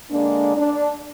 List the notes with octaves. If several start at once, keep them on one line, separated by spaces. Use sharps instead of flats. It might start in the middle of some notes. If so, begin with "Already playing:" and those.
D3 G#3 A#3 D4
D4